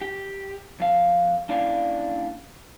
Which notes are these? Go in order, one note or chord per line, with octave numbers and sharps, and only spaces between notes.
G4
F2 F5
A#3 C#4 D4 E4 D5 F5